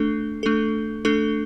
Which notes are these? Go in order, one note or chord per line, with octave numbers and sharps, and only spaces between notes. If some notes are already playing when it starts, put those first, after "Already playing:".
Already playing: A3 D4 A4
A3 D4 A4
A3 D4 A4